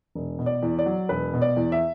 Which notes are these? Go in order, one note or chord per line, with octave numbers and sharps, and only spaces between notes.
E1
B2
D5
E2
D5
F#3
E1 B4
B2
D5
E2
E5